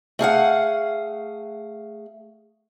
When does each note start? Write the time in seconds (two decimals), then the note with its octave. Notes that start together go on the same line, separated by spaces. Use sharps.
0.19 A3 G#4 F5 F#5